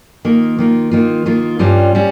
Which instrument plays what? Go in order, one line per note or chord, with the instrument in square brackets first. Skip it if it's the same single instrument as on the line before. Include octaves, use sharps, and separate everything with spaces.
[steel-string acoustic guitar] D#3 A#3 F4
D#3 A#3 F4
D#3 A#3 F4
D#3 A#3 F4
G2 G3 C#4 F4
G3 C#4